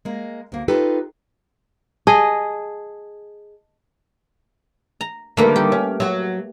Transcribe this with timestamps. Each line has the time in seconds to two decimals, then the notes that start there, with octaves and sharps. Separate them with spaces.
0.05 G#3 A#3
0.52 D2 A#3
0.68 D#4 F4 G4 A4 B4
2.07 G#4 D#5 A5
5.01 A#5
5.37 D3 D#3 G3 A3 A#3 B4
5.56 G4
5.72 C#4
6.00 F#3 F#4